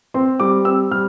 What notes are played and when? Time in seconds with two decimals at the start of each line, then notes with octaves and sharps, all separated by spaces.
0.14 C4 C6
0.40 G3 D6
0.65 C4 E6
0.91 G3 F6